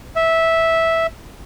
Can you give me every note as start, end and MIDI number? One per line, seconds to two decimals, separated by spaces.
0.16 1.07 76